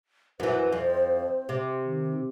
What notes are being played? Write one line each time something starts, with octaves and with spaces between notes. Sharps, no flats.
F#2 E3 C5
F2
C3
D#3